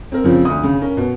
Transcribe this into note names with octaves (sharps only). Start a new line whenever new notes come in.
C4 A#4
C#3 F3 C4
D2 D#6
C#3
C#4 A#4
B2